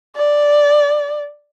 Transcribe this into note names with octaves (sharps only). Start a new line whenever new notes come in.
D5